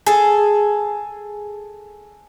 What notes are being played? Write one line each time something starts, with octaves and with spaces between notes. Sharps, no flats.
G#4 A4